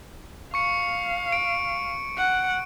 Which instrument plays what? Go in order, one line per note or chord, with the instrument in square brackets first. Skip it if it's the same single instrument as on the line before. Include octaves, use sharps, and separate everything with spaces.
[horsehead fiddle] F5 [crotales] C#6 C#7
[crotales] D7
[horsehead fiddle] F#5